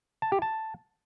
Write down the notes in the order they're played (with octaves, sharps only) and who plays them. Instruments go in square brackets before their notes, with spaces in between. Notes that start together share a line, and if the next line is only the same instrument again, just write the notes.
[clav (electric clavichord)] A5
G4
A5